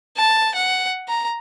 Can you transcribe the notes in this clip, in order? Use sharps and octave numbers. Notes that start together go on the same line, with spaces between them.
A5
F#5
A#5